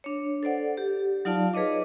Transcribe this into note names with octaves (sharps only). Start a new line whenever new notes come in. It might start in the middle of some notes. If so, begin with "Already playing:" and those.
D4 C#5
A4 C5 D5 F#5
G4
F#3 D#4 F4 D5 F5 A5
G#4 B4 C#5 D#5 D6